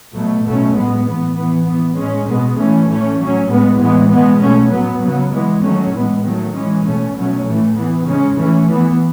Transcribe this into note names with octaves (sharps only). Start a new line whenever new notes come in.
B2 F#3 A3
B2 F#3 A3 C#4
A2 G#3 B3
A2 E3 B3
E3 B3
E3 B3
A2 G#3 C#4
B2 G#3 B3
E3 A3 C#4
A2 E3 A3 C#4
A2 F#3 C#4
A2 G#3 B3
A2 E3 G#3 B3
B2 G#3 B3
B2 A3 C#4
A2 F#3 B3
C#3 F#3 B3
E3 G#3 B3
D#3 F#3 A3 C#4
A2 E3 G#3 B3
D#3 F#3 A3
E3 G#3 C#4
B2 A3 C#4
B2 F#3 A3 C#4
A2 E3 A3
E3 B3
C#3 G#3 C#4
E3 A3 C#4
E3 B3